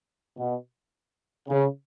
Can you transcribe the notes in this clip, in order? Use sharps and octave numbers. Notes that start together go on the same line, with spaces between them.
B2
C#3